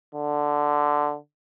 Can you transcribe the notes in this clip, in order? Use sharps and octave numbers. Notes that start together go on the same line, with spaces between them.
D3